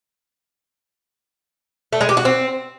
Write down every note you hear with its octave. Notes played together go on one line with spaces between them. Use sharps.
A3
G#3
G4
F#4
C4